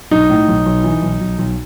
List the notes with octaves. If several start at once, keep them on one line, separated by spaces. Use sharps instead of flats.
B1 D#4
A2
B1
B1
E3
B1
B1
B1